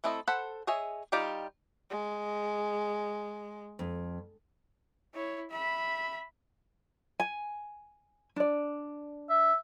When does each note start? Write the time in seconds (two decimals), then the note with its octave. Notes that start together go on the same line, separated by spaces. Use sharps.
0.04 A3 C4 E4 A4 D#5
0.28 A4 C5 F#5 B5
0.67 G#4 C#5 D#5 E5 G#5
1.12 G3 D#4 F4 G4 D5
1.90 G#3
3.79 F2
5.14 E4 C#5
5.51 E5 B5
7.20 G#5
8.36 D4 D5
9.30 E5